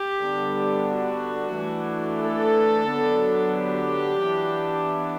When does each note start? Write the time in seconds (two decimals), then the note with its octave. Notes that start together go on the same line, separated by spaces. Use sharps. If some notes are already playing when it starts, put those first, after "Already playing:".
Already playing: G4
0.20 D3 G3 B3 D4
0.88 F#4
1.56 E3 A3 D4
2.23 A4
2.91 D3 F#3 B3 D4
3.58 G4
4.26 E3 B3 D4